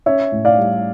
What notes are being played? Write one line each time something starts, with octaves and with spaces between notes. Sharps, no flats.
C#4 C#5 E5
A2
D5 F5
G3